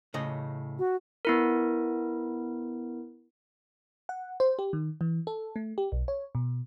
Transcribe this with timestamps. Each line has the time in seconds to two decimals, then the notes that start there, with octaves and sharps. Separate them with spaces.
0.14 A2 C#3 D#5
0.79 F#4
1.25 B3 E4 A#4
4.09 F#5
4.40 C5
4.59 G4
4.73 D#3
5.01 E3
5.27 A4
5.56 A3
5.78 G4
5.92 B1
6.08 C#5
6.35 B2